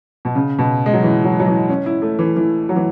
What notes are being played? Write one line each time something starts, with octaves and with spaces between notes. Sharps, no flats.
B2
C#3
B2
G#3
F#3
E3
F#3
F#3
E3
C#4
E4
A3
E3
E3
F#3
E3